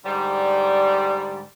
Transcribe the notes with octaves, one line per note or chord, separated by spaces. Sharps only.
G#2 D3 G3